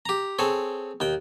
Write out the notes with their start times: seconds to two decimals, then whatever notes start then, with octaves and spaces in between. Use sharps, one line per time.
0.06 G4 A#5
0.39 C4 G#4 A4 C#5
1.00 D#2 G5